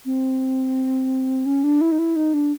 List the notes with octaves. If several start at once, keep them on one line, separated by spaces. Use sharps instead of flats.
C4
C#4
D4
E4
D#4
E4
D#4
D4